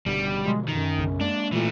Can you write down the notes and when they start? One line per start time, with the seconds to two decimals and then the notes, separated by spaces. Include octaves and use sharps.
0.06 F#1 B2 D3 G3
0.44 B2 D3 F3 G#3
0.68 F#2 D#3
0.98 B1 C#3
1.21 G#3 A#3 D4
1.52 A#2 E3 A3